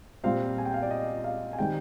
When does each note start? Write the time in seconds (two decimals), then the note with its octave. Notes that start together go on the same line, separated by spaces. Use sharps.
0.24 A#2 G3 C4 F5
0.58 G#5
0.65 G5
0.74 F5
0.82 D5
0.91 D#5
1.24 F5
1.53 G#5
1.59 D#3 G3 C4 G5